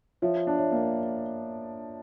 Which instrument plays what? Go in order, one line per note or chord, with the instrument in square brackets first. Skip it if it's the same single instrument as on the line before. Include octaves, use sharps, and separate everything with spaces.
[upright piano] F3 [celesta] C#5 E5
[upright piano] D4
[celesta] C#5 E5
[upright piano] A#3